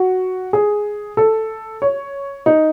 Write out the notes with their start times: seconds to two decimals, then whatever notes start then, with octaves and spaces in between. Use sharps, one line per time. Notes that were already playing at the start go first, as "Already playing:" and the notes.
Already playing: F#4
0.53 G#4
1.17 A4
1.82 C#5
2.46 D#4